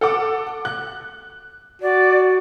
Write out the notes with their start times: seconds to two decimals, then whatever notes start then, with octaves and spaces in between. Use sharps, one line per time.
0.01 A4 F#5 D6
0.65 F#6
1.82 F#4 D5